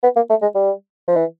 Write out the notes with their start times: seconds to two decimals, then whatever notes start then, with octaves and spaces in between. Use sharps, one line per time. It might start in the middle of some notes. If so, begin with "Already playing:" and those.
0.03 B3
0.16 A#3
0.30 A3
0.42 G#3
0.55 G3
1.08 F3
1.16 E3